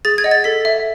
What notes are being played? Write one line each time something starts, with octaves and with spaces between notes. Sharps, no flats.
G#4 A6
G#6
D#5 F#5
A6
A4 B6
E5